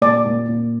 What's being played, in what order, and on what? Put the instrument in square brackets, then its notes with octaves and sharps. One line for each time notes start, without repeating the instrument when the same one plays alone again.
[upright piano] A#2 [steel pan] D5
[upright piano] A#2
A#2